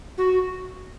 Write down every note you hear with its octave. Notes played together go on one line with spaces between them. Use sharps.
F#4